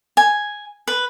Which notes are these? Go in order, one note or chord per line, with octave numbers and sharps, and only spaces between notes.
G#5
B4